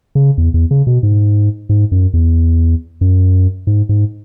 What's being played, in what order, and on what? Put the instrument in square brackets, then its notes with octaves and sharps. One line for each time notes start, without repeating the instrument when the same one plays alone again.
[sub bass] C#3
E2
E2
C#3
B2
G#2
G#2
F#2
E2
F#2
G#2
G#2